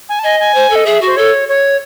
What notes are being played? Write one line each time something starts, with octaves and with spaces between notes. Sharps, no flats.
G#5
A5
D#5 G#5
G#5
C5
A4
D#5
G#4 E5
F#4
C5
A4 C#5
C#5